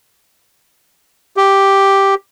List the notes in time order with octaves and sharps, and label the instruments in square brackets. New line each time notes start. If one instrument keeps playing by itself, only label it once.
[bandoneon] G4